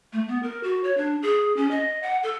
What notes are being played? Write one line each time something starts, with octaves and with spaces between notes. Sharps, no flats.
A3
B3
A#4
F#4
C#5
D4
G#4
C#4
D#5
F#5
A4